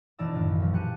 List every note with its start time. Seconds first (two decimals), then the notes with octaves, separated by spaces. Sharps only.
0.19 E1 E3 D#4 D5 A5 E6
0.34 F#2 A2 D#3
0.48 B1
0.60 F3 F#3 B3
0.73 A#2 G4 A5 F#6 C#7 D#7